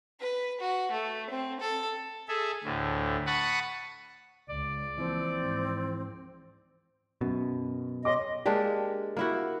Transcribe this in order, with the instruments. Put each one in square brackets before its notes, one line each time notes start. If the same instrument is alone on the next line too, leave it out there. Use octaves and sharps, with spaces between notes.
[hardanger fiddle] B4
F#4
A3
C4
A4
[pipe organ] G#4 A4 E5
D2 A2
F#5 A5 B5 C#6 D#6
[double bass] C#2 [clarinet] D5
[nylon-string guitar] E3 F3 A#3 [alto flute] C4
[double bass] G#2
[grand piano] F#2 [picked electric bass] B2
[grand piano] C#5 C6 D6 [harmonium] D#5
[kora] G#3 A#3 D4 G4
A#3 E4 F#4